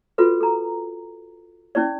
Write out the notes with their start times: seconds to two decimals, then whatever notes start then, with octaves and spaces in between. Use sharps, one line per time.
0.18 F4 F#4 A4 B4
0.41 A4 A#5
1.75 C#4 E4 G4 D5